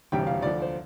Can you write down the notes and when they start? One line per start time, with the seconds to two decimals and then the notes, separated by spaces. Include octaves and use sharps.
0.12 E1 D2 C3 G3 G5
0.27 F5
0.42 D2 D3 F3 D5
0.62 C5